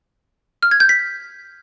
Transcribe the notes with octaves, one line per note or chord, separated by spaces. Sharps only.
F6
G#6
G6
B6